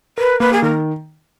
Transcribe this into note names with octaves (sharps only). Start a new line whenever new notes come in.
A#4 B4
A#3 B4
G#4
D#3 A#4